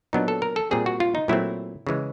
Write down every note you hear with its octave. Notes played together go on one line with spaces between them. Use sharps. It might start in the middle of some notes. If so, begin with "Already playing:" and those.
A#2 F#3 B3 D4 D#4
A4
A#4
A4
A#2 G3 C4 G#4
F#4
F4
D#4
A#2 F#3 A3 C4 E4
C#3 E3 G#3